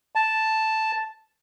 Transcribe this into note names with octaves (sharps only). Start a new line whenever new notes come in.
A5